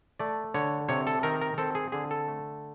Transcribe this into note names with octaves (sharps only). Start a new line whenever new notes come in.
A3 D5
D3 C#5
C3 C#5
A4
D#3 A#4
A#4
C4 A4
G#4
D3 G#4
A4
A3